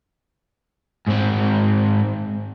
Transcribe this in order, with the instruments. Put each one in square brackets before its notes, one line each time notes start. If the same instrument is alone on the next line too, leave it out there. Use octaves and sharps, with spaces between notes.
[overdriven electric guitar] G#2 C4